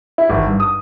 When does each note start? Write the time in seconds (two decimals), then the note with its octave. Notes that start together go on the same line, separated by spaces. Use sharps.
0.18 E4
0.30 G#1
0.46 G2
0.60 D#6